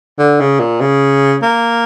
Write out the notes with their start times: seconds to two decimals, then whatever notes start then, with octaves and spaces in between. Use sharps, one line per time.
0.19 D3
0.40 C#3
0.59 A#2
0.81 C#3
1.42 A#3